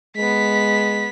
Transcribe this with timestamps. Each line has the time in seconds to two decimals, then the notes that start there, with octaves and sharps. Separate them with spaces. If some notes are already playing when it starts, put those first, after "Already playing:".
0.16 G#3 B3 B6